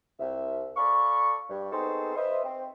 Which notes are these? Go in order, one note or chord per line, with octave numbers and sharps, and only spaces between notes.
C2 E5
A4 D5 F5 B5 C#6
G2
B3 C4 D#4 G#4 A4 C5
B4 C5 D#5 E5
C4